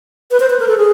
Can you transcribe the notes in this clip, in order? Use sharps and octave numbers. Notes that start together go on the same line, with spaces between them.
B4
C5
B4
A#4
A4
G#4